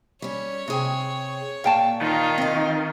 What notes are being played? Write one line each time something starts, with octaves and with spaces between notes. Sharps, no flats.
G3 C#4 C#5
C3 G#4 G5
A#2 F5 G5 A5
D#3 F4
C4 D#5